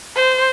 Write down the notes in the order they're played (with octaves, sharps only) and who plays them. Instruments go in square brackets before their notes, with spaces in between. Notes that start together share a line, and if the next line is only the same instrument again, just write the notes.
[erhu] C5